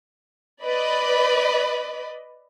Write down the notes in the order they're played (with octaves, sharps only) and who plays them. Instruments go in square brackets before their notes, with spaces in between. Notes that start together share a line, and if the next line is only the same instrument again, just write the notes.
[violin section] B4 D5 D#5 B5